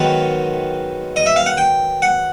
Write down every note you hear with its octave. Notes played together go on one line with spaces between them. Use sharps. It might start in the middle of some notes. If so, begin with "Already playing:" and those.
Already playing: G#2 D#3 F#3 B3 F#5
D#5
E5
F5
F#5
G5
F#5